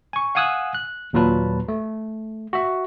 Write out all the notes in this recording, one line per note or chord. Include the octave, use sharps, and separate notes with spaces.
G#5 C#6
F5 F#5 G#5 D#6 E6 F#6
F#6
D#2 A#2 F#3 F4 B4 A5
A3
F#4 E5